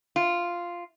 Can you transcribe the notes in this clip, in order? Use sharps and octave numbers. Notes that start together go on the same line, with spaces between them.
F4